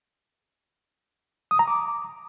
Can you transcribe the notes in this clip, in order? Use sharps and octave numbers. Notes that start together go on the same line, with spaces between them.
D#6
A#5
D6